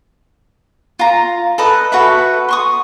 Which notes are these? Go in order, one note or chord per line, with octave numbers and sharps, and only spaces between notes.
F4 A#5
A4 B4 D#5
F#4 A4 B4 E5
C6 C#6 D#6